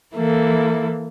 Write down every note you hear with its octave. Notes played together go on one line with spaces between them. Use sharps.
E3 A#3 E4 A4